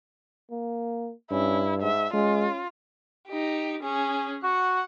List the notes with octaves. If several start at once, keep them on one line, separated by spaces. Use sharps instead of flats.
A#3
G2 C#4 E4
G#2 E5
G#3 C#4 F4
D#4 G4
C#4 G#4
F#4 F#5